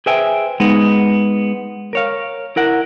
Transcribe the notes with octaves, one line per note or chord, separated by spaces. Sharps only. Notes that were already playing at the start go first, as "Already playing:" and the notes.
G#4 B4 C5 E5 G5 G#5
G#3 B3 D#4 G#4
A#4 C#5 F5
E4 A#4 F#5